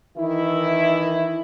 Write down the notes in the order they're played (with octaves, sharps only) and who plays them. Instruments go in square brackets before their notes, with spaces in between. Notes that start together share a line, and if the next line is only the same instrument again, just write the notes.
[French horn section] D#3 E3 E4